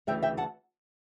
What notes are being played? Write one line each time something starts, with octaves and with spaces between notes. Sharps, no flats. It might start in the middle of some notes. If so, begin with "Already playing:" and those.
D2 C#3 E3 E5 G5
E5 G5
F#5 A5